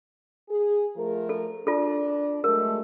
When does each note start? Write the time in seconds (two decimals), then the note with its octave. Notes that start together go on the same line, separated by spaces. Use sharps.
0.49 G#4
0.95 F3 A3 A#4
1.29 A4
1.67 D4 F4 A4
2.44 F#3 G#3 A3 A#4